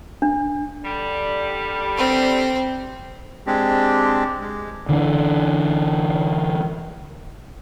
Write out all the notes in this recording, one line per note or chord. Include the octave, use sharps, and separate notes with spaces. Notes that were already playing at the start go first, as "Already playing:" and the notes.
D4
D3 G3
C4
G#3 C4 D4 G4
G#3
D3 E3 A3 D4